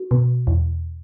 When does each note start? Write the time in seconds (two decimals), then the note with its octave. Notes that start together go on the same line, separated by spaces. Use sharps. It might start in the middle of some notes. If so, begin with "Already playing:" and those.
Already playing: F#4
0.11 B2
0.47 E2